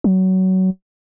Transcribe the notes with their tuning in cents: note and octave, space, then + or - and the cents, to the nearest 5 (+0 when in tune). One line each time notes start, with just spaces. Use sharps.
F#3 +20